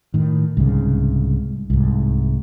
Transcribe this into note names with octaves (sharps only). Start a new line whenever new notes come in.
A2 D#3
C2 G#2 C#3
C2 G#2